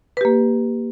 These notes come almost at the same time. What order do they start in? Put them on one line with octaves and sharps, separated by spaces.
B4 G4 A#3